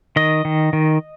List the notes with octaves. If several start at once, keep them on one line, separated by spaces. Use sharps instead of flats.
D#3 D#5
D#3
D#3